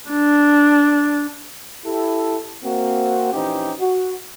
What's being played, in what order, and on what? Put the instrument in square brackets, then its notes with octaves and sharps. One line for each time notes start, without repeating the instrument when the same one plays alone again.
[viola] D4
[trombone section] E4 G4 A4
A#3 C4 F#4
A#1 E3 C#4 D#4 G4 C5
F#4